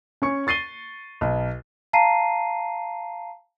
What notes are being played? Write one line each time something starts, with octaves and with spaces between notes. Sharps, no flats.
C#4 G#5 C#6 C#7
C#6 A6 C7 D#7 G7
B1
F5 A5 A#5 C7 D#7